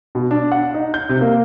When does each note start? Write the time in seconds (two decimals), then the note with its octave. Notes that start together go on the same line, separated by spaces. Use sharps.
0.15 B2
0.31 D4
0.52 F#5
0.74 D#4
0.94 G6
1.09 C3
1.21 A#3